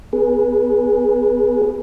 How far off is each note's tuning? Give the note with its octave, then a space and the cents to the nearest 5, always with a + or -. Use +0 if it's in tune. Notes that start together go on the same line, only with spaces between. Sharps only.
B3 +15 G#4 +0 B4 -30